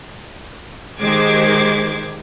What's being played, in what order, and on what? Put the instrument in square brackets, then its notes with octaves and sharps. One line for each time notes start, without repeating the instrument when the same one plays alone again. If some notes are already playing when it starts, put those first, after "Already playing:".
[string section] D#3 G#3 G4 C5 D6 G#6